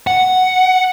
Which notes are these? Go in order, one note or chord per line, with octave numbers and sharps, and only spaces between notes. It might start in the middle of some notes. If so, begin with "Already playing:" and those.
F#5